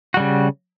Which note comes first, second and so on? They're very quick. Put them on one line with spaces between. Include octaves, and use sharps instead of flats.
F#4 G3 C#3